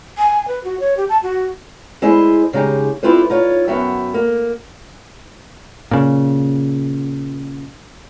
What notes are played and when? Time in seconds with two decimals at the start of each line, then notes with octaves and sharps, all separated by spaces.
0.18 G#5
0.48 B4
0.64 F#4
0.80 C#5
0.97 G4
1.09 A5
1.23 F#4
2.02 G#3 E4 G#4 C5 D#5
2.53 C#3 G#3 D#4 G4
3.03 C4 E4 F4 G4 B4 C5
3.30 D#4 F4 C#5
3.67 F#2 B3 F#4 E5 G5
4.14 A#3
5.91 A#2 C#3